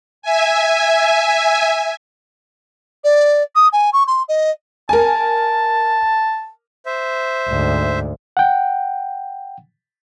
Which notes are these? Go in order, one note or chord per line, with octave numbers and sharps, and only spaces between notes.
E5 G#5
D5
D#6
G#5
C#6
C6
D#5
A#4 G#5 A5
C5 E5
D2 G#2
F#5 G5